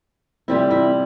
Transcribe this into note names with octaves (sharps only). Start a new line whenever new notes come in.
C3 E3 G3 C4 E4
E4